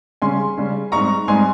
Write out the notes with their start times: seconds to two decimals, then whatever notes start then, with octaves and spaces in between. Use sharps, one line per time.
0.22 C#3 G3 C#4 G#5 C6
0.58 C#3 G3 C#4
0.92 G#2 G3 C4 D#4 A#5 C#6
1.28 G#2 G3 C4 D#4 G#5 C6